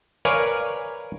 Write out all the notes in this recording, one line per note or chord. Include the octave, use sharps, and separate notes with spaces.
A#4 B4 C#5 D5 F5 G#5